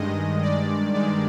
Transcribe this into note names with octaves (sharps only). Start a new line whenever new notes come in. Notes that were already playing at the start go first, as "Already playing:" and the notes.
Already playing: G2 D#3 G#3 D#5
D5
G2 D#3 G#3 D5